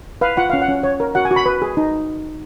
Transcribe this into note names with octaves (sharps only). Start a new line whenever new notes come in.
B4 F5
F4 F#5
C#4 F5
F#5
C#4
C#5
A#4
F#4 F#5
G#5
F#4
B5
B4
G#4
D#4